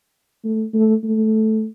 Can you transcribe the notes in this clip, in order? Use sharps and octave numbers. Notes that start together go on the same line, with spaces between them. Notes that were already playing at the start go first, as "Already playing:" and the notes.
A3
A3
A3